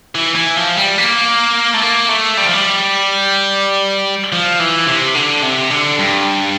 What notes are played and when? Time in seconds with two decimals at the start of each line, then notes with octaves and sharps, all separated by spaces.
0.15 E3
0.35 E3
0.57 F3
0.77 G3
0.98 A#3
1.74 A3
1.82 A#3
2.09 A3
2.37 G3
2.45 F3
2.54 G3
4.32 F3
4.60 E3
4.87 C3
5.15 D3
5.43 C3
5.71 D3
5.99 G2